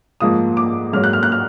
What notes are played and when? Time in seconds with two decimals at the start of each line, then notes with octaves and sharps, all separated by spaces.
0.20 G#2 F3 A#3 D#6
0.57 D6
0.93 G#2 F#3 A#3 F6
1.04 F#6
1.13 F6
1.23 F#6
1.32 F6